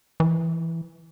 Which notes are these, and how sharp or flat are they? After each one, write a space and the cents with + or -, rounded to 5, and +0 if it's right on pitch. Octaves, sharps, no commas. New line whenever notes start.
E3 +5